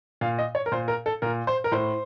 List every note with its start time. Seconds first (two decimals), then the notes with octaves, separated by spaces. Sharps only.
0.21 A#2 F5
0.39 D#5
0.55 C#5
0.66 A#4
0.72 A#2 C5
0.88 A#4
1.06 A4
1.22 A#2 A#4
1.47 C5
1.64 A#4
1.72 A2 C5